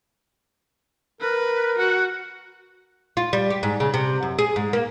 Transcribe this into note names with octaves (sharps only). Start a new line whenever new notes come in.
A#4 B4
F#4 F#5
F4
G3
G4
G#2
C#3
C3
F#2
G#4
G#2
A#3